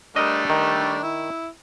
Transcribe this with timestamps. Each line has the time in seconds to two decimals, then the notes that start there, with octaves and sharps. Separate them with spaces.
0.16 G3 A3 D4 A#4 D#5
0.50 D#3
1.03 E4